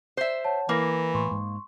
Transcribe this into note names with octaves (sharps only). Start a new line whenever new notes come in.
C5 E5
C#5 F#5 A5
E3 A#3 E4 A#4 A#6
A2 C6 C#6
G#2